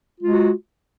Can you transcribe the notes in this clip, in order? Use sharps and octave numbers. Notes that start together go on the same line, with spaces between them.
G#3 F4 F#4